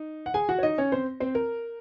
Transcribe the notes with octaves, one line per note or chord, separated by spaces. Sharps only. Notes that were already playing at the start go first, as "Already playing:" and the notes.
Already playing: D#4
F#5
G#4 G#5
F#4 F#5
C#5
D#4 D#5
C#4 C#5
C4 C5
C4 C5
A#4